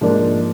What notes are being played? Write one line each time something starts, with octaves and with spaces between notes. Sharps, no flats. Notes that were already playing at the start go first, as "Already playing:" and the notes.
G#2 F3 A#3 D4